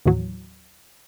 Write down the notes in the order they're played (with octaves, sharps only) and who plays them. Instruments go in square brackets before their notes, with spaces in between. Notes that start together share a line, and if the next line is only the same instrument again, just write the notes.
[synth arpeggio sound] D#2 A2 E3 F#3